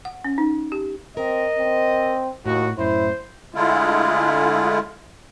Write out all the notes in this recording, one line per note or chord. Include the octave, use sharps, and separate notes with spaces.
F#5
C#4
D#4
G4
C4 A#4 D#5
C4
D#2 A2 F#4
F#2 A2 E4 C5
D3 G#3 A3 E4 F4